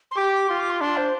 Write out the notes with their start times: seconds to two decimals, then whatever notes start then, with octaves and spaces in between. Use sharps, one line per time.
0.11 C6
0.16 G4 D6
0.33 D6
0.49 F4 C6
0.60 D6
0.70 C6
0.81 D4 C6
0.97 C5